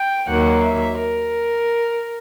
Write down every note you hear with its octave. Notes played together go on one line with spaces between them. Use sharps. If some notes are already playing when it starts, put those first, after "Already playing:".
Already playing: G5
D#2 D#3 F#3 A#3 F#5
E5
A#4